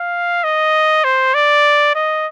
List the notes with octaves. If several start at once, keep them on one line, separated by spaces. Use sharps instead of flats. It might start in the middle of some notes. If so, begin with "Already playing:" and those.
Already playing: F5
D#5
C5
D5
D#5